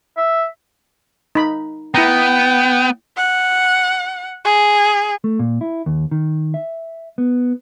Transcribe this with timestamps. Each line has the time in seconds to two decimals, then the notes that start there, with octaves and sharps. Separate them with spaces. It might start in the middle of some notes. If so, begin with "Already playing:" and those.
0.17 E5
1.35 D#4 B5
1.95 B3 E4 G5 A#5
3.17 F#5
4.45 G#4
5.24 A3
5.39 A#2
5.61 E4
5.86 D#2
6.11 D#3
6.54 E5
7.18 B3